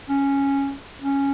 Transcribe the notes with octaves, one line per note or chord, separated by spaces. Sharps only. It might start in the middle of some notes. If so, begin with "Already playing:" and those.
C#4
C#4